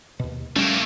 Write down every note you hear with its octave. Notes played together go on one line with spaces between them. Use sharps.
D#2 B2
G3 A3 A#3 C#4